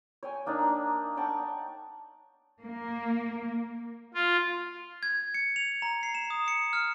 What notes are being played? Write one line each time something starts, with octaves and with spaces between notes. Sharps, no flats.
C#5 G5 G#5
A#3 D4 D#4
F#5 G5 A5 C#6
A#3
F4
G#6
C#7
F7
A#5
C7
E7
D#6
C#7
F6